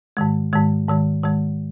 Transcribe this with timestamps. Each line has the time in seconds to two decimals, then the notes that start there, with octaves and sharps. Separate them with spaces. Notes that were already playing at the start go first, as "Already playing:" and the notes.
0.17 G#2 D#3 G#3
0.53 G#2 D#3 G#3
0.88 G#2 D#3 G#3
1.24 G#2 D#3 G#3